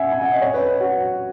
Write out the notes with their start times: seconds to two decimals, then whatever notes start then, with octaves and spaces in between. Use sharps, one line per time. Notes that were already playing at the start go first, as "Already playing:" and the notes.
Already playing: E5 F#5 G#5
0.12 G#5
0.22 F#5
0.31 D#5
0.41 C#5
0.54 B4
0.81 F#4